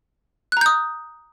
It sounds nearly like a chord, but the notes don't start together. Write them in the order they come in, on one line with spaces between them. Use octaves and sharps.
F#6 A#5 G6 D#6